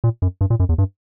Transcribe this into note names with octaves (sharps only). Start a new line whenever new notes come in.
A#2
F#2
G2
A#2
F#2
E2
G2